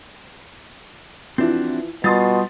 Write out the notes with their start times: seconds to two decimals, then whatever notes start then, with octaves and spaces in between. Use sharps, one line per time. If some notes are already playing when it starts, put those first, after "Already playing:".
1.38 E3 F3 C4 D4 E4 F#4
2.04 B2 G3 F4 C6 D#6 A6